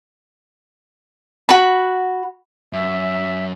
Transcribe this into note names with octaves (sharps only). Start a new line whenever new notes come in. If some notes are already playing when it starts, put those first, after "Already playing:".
F#4 B5
F#2 E5